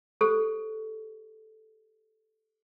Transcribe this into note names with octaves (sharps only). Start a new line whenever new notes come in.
G4 A4 C5